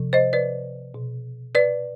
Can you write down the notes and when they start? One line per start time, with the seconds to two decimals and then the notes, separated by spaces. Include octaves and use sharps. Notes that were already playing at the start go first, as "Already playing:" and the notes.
Already playing: C3 F3
0.13 C5 D#5
0.33 B4 D5
0.94 B2
1.55 B4 D5